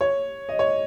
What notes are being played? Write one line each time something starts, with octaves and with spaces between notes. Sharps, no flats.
C#5
D#5
C#5